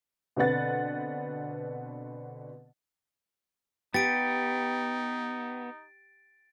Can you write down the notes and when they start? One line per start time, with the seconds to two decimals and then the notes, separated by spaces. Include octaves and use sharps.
0.36 B2 D3 C4 B4 F#5 A6
3.94 B3 D#4 G4 A6 D7